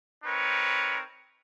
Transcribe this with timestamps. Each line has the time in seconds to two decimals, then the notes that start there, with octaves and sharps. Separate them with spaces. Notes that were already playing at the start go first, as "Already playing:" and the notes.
0.23 C4 D#4 A#4 B4 C#5